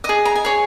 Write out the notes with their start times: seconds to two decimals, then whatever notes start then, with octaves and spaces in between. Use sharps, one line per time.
0.04 D#5 D#6
0.09 G#4
0.25 A#5
0.35 G#5
0.45 G#4 C#5